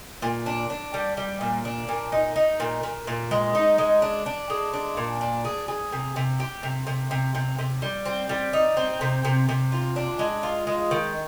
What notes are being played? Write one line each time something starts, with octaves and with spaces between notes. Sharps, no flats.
A#2
D4
D4
G3
G3
A#2
D4
A#2
D#4
D#4
A#2
A#2
A#2
G#3
D#4
G#3
D4
D4
G#3
D4
A#2
D4
G#4
G#4
C3
C3
G4
C3
C3
C3
C3
C3
G3
C4
G3
D#4
C4
C3
C3
C3
F4
D4
G#3
F4
G#3
D#3